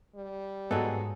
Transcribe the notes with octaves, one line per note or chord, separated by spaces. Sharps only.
G3
G#2 F#3 B3 D#4 G#4 A4